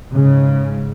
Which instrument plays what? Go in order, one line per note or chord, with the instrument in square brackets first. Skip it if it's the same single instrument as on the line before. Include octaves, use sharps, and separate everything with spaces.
[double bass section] G#2 C#3